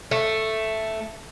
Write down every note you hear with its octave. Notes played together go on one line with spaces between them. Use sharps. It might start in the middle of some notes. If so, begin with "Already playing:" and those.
A3